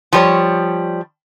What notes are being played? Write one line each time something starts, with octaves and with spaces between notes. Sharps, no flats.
F3 G3 C#5